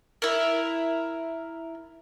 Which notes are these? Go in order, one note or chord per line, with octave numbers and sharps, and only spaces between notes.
E4 A#4